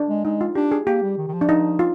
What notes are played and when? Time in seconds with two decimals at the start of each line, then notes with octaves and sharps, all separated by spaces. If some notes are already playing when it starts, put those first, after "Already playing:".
Already playing: D4
0.09 G#3
0.24 G#3 D#4
0.41 F4
0.55 D4 G4
0.71 G#4
0.87 A#3 G4
1.02 G3
1.18 D#3
1.28 D#3
1.33 F3
1.41 D4
1.49 D#4
1.79 F4